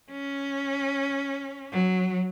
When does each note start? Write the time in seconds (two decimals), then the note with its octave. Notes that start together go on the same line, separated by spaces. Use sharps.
0.11 C#4
1.72 F#3